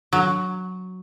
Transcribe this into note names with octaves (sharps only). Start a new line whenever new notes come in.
F#3